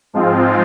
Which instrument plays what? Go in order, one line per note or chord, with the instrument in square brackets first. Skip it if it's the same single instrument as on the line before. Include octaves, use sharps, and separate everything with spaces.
[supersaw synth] G#2 F3 G#3 C4 F4